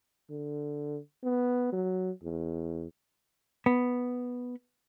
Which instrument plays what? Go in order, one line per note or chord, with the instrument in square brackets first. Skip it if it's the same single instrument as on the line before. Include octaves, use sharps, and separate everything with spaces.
[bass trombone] D3
B3
F#3
E2
[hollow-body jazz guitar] B3